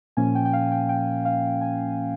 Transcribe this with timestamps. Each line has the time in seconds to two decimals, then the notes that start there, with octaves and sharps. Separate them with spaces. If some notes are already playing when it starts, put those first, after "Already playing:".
0.17 A#2 F3 A#3 C#4 G#5
0.35 G5
0.45 G5
0.53 F5
0.72 G5
0.89 G5
1.25 F5
1.61 G#5